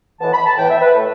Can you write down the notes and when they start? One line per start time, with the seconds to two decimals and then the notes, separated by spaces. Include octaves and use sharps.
0.20 A2 E3 B3 A5
0.33 B5
0.45 A5
0.58 A2 E3 B3 G5
0.70 E5
0.82 B4
0.94 A2 A3 A4